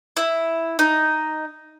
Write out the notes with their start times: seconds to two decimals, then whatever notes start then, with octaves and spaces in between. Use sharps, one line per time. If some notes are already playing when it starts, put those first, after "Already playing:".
0.17 E4
0.79 D#4